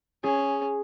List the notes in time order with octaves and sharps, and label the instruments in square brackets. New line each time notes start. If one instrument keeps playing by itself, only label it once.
[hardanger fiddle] C#4 [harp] G#4